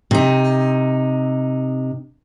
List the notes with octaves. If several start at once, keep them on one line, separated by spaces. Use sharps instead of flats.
C3 D#4